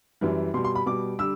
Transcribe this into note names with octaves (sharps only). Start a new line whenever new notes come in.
F#2 E3 G3
B2 G3 C6
C6
B5
B2 G3 D6
D3 G3 E6